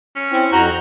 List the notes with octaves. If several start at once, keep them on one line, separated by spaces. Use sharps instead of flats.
C#4
C4 E4
F2 F#4 A#5 G6